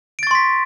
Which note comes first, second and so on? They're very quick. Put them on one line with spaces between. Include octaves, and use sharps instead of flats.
D7 A6 C#6 C6 B6